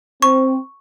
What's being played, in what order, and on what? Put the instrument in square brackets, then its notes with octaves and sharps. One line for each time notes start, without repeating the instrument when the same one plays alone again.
[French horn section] C4 [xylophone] C#6